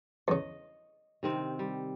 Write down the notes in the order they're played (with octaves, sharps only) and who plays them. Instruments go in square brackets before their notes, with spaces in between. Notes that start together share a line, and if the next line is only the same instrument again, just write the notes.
[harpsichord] E2 C#3 [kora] D#5
[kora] C3 D#3 C4
G3